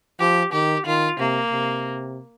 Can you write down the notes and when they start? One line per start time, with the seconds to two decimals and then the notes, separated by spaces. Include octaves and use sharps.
0.20 F3 G4
0.53 D#3 G4
0.86 D#3 F4
1.19 C3 A#3
1.52 C3